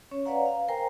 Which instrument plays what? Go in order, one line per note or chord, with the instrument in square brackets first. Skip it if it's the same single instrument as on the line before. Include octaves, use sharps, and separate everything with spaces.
[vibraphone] C#4 C#5
B4 C#5 D5 F5 F#5 A#5
F5
A#4 C5 G5 G#5 A#5